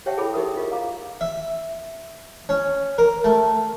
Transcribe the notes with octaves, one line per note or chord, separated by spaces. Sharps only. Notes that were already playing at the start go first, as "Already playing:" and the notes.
G4 C#5 E5 F#5 G5 A5
E4 G#4 A4 C#5 B5 D6
D#4 G4 A4 A#4 E5 D#6
F4 G4 D#5
F5 A#5 D6
E5
C#4
A#4
A3